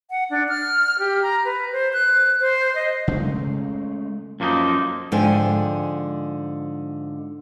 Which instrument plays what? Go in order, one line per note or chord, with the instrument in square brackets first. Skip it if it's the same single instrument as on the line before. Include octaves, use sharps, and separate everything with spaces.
[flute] F#5
D4
F6
G4
A#5
B4
C5
F#6
C5
D#5
[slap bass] C#3 G#3 A3
[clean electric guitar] F#2 F3 A#3 B3 D#4
[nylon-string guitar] G#2 D3 F3 G5 G#5